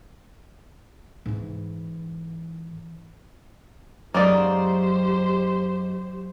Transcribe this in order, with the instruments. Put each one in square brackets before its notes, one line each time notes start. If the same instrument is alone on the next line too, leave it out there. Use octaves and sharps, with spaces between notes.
[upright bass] G#2 E3
[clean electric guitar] F#2 G#3 [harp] F#3 [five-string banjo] A#3 D#4 D5 [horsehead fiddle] G4 C5